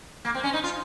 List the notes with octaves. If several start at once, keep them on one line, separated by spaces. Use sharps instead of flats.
A#3
C4
C#4
D#4
F4